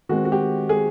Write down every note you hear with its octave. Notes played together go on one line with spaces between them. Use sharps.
D#3 G#3 C4 F#4
F#4
G4
G#4